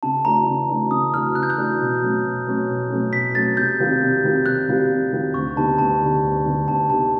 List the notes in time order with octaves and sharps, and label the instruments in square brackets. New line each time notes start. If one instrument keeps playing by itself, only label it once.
[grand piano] C#3 [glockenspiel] A5
[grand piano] E3 A3 D4 F#4 [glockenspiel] A#5
[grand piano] C#3
E3 A3 D4 F#4
[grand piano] C#3 [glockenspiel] D#6
[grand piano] E3 A3 D4 F#4 [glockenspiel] F6
[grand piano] C#3 [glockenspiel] F#6
[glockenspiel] G6
F#6
[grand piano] E3 A3 D4 F#4
B2
F#3 A3 C#4
B2
F#3 A3 C#4
B2
F#3 A3 C#4
[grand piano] B2 [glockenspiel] B6
[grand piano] F#3 A3 C#4 [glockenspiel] A6
[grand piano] C3 [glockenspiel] G6
[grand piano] D#3 G3 C4 F4
C3
D#3 G3 C4 F4
[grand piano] C3 [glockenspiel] F#6
[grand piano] D#3 G3 C4 F4
C3
D#3 G3 C4 F4
[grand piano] D2 [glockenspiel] C#6
[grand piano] D3 G3 B3 D#4 [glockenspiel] A5
[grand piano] D2 [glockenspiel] A5
[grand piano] D3 G3 B3 D#4
D2
D3 G3 B3 D#4
[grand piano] D2 [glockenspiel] A5
[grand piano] D3 G3 B3 D#4 [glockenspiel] A5